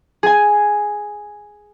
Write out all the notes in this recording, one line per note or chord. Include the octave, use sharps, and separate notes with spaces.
G#4 G#5